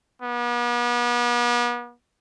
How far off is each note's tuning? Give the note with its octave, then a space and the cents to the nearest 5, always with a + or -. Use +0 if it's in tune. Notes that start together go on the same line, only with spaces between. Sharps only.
B3 -40